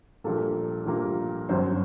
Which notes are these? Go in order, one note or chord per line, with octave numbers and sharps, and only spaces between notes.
A#1 A#2 G3 A#3 A4
A#1 A#2 G3 A#3
G1 F#2 D#3 F#3 C5